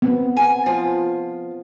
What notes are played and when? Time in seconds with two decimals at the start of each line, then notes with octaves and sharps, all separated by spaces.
0.02 B3 C4
0.37 G#5
0.66 F3 F4